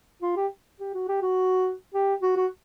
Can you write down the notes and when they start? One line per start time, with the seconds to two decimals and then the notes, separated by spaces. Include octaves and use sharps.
0.22 F4
0.36 G4
0.80 G4
0.94 F#4
1.09 G4
1.22 F#4
1.94 G4
2.22 F#4
2.36 F#4